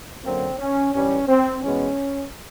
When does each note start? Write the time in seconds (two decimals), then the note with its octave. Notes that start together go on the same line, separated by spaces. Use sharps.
0.25 F#2 D3 F#3 A#3 C4
0.59 C#4
0.94 G2 E3 G3 C#4
1.28 C4
1.63 E2 B2 G#3 B3 C#4